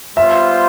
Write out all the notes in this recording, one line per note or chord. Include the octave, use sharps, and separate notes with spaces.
G3 B3 F4 C5 E5